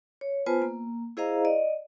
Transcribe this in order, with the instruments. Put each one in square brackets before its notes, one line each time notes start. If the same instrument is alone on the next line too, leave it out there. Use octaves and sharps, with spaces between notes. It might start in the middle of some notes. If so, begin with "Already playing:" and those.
[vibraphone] C#5
B3 F4 B4 C5 G#5 A5
A#3
E4 G#4 C5 D#5 F5 A#5
D5 D#5